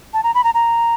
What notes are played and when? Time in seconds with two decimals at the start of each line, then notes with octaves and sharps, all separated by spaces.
0.14 A5
0.23 A#5
0.35 B5
0.44 A#5
0.54 A#5